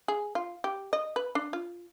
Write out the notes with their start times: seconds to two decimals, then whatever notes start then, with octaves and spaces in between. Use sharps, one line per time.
0.08 G#4
0.35 F4
0.64 G4
0.93 D#5
1.16 B4
1.35 D4
1.53 F4